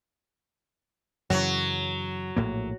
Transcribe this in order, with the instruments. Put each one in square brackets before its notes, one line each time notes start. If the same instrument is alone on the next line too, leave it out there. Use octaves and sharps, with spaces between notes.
[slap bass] F#2 C#3 E3 [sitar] F#3
[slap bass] A#1 A2 A#3